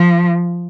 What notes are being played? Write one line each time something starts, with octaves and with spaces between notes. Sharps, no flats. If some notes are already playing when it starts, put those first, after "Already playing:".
Already playing: F3